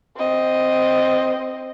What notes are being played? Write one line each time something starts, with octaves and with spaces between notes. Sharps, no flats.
C4 D#5